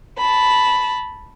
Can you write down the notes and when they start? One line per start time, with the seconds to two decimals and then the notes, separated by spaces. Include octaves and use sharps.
0.17 A5 B5